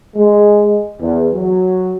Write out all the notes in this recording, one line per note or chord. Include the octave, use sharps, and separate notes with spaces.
G#3
E2
F#3